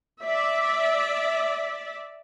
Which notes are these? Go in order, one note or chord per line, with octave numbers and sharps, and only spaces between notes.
D5 E5